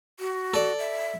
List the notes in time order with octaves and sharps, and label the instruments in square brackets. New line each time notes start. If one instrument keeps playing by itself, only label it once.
[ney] F#4
[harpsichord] A4 D5
[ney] E5